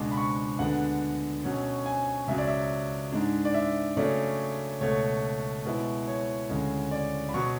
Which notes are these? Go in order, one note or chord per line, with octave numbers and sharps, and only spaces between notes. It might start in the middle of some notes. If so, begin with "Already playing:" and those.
Already playing: C#2 B2 G#3 D4 D6
B5
C#6
D2 D3 G#3 B3 D4 F#5
B2 F#3 C#4
G#5
C#2 C#3 F#3 E5
D5
E5
G#2 G#3 D4
D5
E5
C#3 F#3 A3 C#4 D5
C#2 B2 A3 C#5
B2 G#3 B3 E4
C#5
D2 C#3 G#3 C#4
D5
B5
B2 F#3 C#6